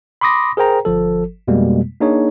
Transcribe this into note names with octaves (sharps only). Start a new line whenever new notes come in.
B5 C6 D6 D#6 A#6
G#4 A#4 C5 G5 A#5
G1 F3 A4
F2 B2 G3 G#3 A#3
A#3 D4 D#4 G#4 C#5